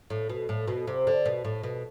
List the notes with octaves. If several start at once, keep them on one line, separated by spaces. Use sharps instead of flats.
A2
B2
A2
B2
C3
D3
B2
A2
B2